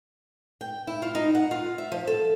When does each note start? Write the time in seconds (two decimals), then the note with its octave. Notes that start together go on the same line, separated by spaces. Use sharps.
0.61 G5
0.87 E4
1.02 F4
1.15 D#4
1.35 F#5
1.51 F4
1.78 E5
1.92 F3
2.07 A4